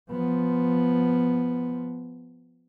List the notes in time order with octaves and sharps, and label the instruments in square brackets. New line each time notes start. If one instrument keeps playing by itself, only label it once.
[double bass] F3 B3